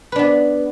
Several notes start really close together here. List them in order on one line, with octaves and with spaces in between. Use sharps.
B4 D4 B3